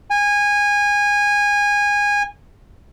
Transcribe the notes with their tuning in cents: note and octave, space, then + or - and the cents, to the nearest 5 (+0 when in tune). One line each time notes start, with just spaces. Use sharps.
G#5 -20